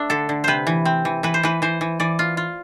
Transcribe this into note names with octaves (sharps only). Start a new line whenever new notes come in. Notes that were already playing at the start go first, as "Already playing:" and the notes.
Already playing: A3 D4 E5
D3 A4
D3
C3 B4 C5
E3
C4
E3
E3 B4
C5
E3 B4
E3 C5
E3
E3 D5
F4
F4